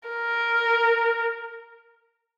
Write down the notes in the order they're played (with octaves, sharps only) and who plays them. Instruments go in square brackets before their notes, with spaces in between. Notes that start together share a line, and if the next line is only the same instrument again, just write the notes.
[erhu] A#4